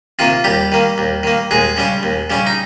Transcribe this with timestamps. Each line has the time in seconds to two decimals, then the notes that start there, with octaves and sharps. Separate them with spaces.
0.19 C3 D#3 A#3 F4
0.44 D#2 G3 G4
0.72 D#3 A#3
0.98 D#2
1.23 D#3 A#3
1.51 D#2 G#3 G#4
1.77 C#3 G3 C#4
2.03 D#2
2.30 C#3 G3 C#4
2.47 D#4